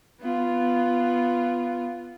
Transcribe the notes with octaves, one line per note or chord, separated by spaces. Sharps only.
B3 F4